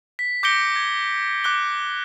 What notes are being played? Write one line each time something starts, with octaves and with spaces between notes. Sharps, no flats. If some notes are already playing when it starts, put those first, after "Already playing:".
B6
D6 G6 A#6 C#7 D7 G7
G#6
D6 F#6 G7